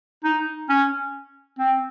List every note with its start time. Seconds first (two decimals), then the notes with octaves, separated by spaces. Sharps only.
0.24 D#4
0.69 C#4
1.59 C4